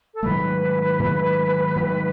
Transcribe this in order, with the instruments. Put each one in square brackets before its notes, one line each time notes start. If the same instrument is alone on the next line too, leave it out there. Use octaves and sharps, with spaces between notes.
[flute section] A4
[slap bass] G#2 D#3 F#3 A3 [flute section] B4
[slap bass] G#2 D#3 F#3 A3
G#2 D#3 F#3 A3